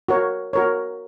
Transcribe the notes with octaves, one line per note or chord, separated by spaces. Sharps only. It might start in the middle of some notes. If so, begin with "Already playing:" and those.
F#4 A#4 C#5
F#4 A#4 C#5